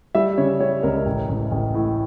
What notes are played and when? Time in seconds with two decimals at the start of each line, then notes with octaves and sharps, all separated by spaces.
0.15 G3 E5
0.38 C#3 C#5
0.60 G3 C#5
0.83 C#2 A#4
1.06 A1
1.29 A1
1.52 A1
1.74 A2